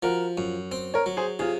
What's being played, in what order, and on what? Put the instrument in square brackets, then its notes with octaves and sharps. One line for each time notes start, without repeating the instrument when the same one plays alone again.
[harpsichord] F3 [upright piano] F#4 A#4
[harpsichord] F#2
C4
[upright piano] A#4 C#5
[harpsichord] F#3
[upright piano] G#4 C5
[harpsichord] C3 [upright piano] F4 G#4